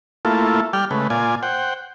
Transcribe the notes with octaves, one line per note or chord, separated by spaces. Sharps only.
A3 A#3 E4 F4 A4
G3 D5 G5 F6
C#3 G#3 A3 B4
A#2 F4 D5 G#5
C5 F#5 G5